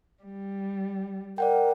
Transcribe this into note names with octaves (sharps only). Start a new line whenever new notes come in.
G3
A#4 D5 F#5 G5